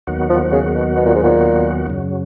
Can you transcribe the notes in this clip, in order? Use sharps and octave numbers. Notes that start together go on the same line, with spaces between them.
D#2 D#3 F#3 B3 F#4
F3
C#3
B2
B2
A#2
G#2
A#2
F#2 C#3 F#3